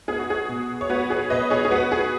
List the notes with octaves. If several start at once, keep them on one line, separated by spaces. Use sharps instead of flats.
B3 G#4
F#4
G#4
B2
C#5
B3 F#4 B4
G#4 C#5
B2 B4 D#5
G#4 C#5
G#4
B3 F#4 B4
G#4